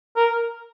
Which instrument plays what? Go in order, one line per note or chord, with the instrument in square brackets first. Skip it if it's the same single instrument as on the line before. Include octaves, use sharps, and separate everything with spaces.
[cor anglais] A#4